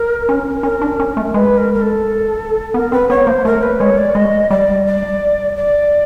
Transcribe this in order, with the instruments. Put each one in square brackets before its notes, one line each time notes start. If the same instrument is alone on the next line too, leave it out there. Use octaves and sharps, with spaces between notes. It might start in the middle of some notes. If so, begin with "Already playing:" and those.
Already playing: [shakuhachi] A#4
[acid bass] C#4
[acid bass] C#4 [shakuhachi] A#4
[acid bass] D4
C#4
A3
[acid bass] G#3 [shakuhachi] B4
[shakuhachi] A#4
A#4
A4
[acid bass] B3 [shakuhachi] A#4
[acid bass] C4 [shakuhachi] B4
[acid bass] B3 [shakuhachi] C#5
[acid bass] A#3 [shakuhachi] C5
[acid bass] A3 [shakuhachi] A#4
[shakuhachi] B4
[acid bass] G#3 [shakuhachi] C#5
[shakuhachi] D5
[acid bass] G#3 [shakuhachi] D#5
[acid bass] G3 [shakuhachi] D5
[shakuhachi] D5
D5